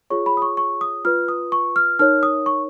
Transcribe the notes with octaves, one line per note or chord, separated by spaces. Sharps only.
F4 G#4 C#5 C#6
B5
D#6
C#6
C#6
D#6
F4 B4 F6
D#6
C#6
F6
D#4 A#4 C#5 F6
D#6
C#6